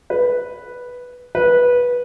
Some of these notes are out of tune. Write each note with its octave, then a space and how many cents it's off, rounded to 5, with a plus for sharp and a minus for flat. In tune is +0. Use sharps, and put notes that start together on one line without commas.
B4 -5
B4 -15